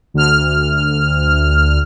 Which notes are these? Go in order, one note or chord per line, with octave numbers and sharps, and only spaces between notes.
D2 F6